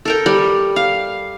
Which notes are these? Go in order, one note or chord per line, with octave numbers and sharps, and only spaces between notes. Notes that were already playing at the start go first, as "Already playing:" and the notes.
A4 A#4 G5
G3
F5